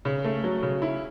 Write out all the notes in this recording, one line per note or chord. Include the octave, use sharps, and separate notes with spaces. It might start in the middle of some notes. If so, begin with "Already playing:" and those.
C#3
A3
F#3
C#3
E4